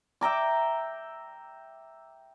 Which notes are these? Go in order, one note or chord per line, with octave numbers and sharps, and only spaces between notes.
E5 G5 A#5 D6